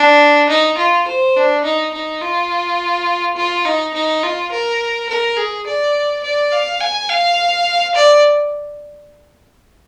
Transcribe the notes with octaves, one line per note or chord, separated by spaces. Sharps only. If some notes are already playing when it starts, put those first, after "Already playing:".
Already playing: D4
D#4
F4
C5
D4
D#4
D#4
F4
F4
D#4
D#4
F4
A#4
A#4
G#4
D5
D5
F5
G#5
F5
D5